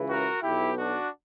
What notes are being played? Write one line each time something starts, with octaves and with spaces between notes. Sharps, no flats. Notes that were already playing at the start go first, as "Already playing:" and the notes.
Already playing: C#2 C#3 E3
F#4 A#4
B1 B2 E4 G4
D4 F#4